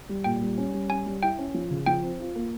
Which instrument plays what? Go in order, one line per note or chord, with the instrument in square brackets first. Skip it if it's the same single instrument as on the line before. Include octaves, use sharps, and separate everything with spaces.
[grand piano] G3
[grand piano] A#2 [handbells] G5
[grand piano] G3
C#4
G3
[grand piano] C#4 [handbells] G#5
[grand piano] G3
[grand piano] E4 [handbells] G5
[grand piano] C#4
F3
C#3
[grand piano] F3 [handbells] G5
[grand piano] C4
F4
A#3